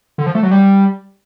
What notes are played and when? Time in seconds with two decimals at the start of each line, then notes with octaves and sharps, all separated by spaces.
0.18 D3
0.26 F3
0.35 A3
0.43 F#3
0.51 G3